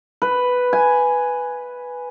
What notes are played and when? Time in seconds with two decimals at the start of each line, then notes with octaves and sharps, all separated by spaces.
0.22 B4
0.73 G#5